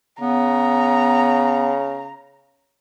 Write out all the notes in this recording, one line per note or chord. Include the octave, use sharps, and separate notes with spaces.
C#3 B3 A#5